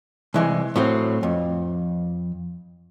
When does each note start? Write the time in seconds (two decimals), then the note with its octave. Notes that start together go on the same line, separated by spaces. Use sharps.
0.34 C2 E3 G#3
0.76 A2 F#3 C4
1.23 F2